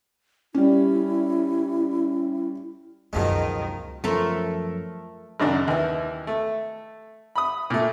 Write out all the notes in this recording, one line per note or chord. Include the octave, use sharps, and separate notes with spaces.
G3 C#4 E4
C#2 F#2 B2 D#3 F3 G#3
F#2 F3 A3 A4 A#4
G#1 F#2 C#3 D4
D#2 E3
A3
B5 D#6
A#2 A3